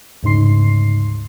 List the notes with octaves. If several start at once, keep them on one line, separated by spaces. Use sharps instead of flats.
D2 G#2 C#3 D#4 C6 C7